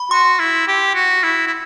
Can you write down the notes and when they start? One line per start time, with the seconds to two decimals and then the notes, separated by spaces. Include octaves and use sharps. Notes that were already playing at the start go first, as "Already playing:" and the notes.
Already playing: B5
0.11 F#4 C6
0.39 E4
0.68 G4
0.95 F#4
1.23 E4
1.47 E4